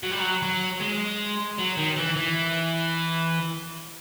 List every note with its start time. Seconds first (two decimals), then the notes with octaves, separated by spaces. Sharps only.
0.03 F#3
0.11 G3
0.19 F#3
0.42 F#3
0.81 G#3
1.58 F#3
1.77 D#3
1.97 E3
2.16 E3